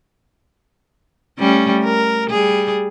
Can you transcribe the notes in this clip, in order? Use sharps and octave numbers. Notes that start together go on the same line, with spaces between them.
G3 A3 C#4
A#4
G3 G#4